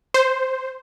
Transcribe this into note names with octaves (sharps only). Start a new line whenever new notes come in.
C5